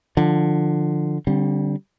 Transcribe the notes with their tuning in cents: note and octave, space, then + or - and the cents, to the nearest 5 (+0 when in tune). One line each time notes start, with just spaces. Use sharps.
D3 +15 F3 +0
D3 -10 G3 -15 C4 +25